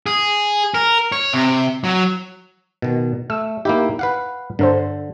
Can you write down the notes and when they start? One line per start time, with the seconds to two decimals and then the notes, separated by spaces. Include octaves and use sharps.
0.06 G#4
0.74 A#4
1.12 C#5
1.34 C3
1.84 F#3
2.82 B2 D#3
3.30 A3 E6
3.65 A#3 D#4 E4 G4
3.99 B4 F5 F#5
4.59 G2 D3 A4 C5